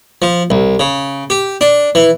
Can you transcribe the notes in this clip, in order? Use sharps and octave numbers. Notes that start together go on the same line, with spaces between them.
F3
C2
C#3
G4
D4
E3